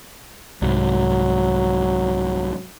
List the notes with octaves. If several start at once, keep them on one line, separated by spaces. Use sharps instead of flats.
C2 G#2 F#3